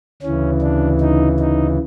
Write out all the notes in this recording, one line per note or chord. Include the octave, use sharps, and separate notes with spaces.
D2 C#3 E3 C#4
D4
D#4
D#4